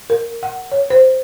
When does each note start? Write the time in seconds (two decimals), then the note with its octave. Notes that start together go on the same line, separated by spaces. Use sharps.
0.10 A#4
0.43 F#5
0.72 C#5
0.90 C5